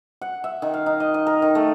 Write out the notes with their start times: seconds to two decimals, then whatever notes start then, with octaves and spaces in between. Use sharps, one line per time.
0.21 F#5
0.44 E5
0.62 D#3
0.74 F5
0.86 D#4
1.00 D#5
1.14 D#5
1.27 A#4
1.42 D#3
1.55 A3